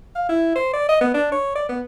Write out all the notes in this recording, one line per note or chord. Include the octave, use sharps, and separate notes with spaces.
F5
E4
C5
D5
D#5
B3
D4
C#5
D5
B3